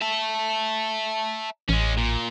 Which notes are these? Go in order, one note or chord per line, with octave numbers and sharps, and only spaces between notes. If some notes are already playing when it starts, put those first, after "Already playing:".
E5 A5
A1 G#3 C#4
A#2